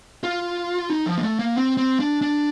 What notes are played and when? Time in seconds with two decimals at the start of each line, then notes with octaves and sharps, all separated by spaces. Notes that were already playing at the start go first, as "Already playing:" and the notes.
0.24 F4
0.90 D#4
1.06 F3
1.18 A#3
1.23 A3
1.39 A#3
1.56 C4
1.77 C4
2.00 D4
2.21 D4